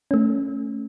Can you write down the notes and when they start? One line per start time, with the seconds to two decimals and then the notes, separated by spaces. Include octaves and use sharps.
0.11 A3 C#4